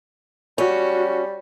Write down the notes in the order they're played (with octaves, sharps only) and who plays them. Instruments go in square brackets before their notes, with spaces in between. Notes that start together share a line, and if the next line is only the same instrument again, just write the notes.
[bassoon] G3 [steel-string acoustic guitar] C#4 [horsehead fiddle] F#4